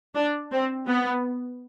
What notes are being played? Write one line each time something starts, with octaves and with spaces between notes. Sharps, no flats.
D4
C4
B3